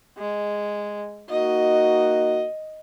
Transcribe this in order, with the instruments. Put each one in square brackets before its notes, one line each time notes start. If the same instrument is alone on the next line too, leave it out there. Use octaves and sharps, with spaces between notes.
[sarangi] G#3
[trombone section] A#3 D#4 F#4 [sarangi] D#5